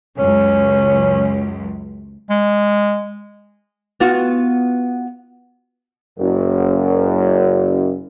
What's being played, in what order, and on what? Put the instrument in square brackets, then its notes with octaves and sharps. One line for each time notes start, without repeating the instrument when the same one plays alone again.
[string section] C#2 F#2 [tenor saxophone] C#4
[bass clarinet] G#3
[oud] B3 F4 F#4
[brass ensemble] F#1 F#2